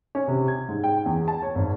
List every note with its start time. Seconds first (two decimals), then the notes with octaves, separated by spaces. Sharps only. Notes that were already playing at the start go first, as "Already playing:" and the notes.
0.15 C#4
0.28 C3
0.48 G#6
0.68 G#2
0.84 G5
1.06 E2
1.28 A5
1.43 C#5
1.55 G#1